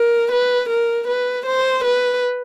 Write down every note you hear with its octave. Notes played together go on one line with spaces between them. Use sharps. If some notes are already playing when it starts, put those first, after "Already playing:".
Already playing: A#4
B4
A#4
B4
C5
B4